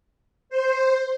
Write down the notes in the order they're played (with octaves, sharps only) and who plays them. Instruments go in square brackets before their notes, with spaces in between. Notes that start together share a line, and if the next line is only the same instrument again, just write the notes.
[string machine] C5